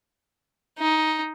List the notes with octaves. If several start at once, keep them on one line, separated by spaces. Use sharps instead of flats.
D#4